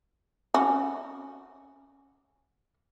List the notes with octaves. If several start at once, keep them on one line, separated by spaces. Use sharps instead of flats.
C#4 F#4